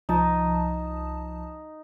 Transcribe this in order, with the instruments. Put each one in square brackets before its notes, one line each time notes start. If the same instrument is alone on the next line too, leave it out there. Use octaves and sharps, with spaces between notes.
[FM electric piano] C2 F3 A5 [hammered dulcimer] D#4